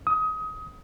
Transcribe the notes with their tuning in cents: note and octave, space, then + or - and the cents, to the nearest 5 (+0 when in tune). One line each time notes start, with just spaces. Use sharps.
D#6 +25